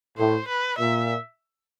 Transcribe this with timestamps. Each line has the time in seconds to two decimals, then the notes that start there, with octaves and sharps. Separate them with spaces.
0.18 A2 C5
0.48 B4
0.78 A#2 E5